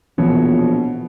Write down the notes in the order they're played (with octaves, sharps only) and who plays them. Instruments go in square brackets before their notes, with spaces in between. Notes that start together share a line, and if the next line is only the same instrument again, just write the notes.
[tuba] A#1 [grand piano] B2 C#5 [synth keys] E3 F3